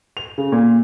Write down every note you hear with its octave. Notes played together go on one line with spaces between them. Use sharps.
F7
C#3
A#2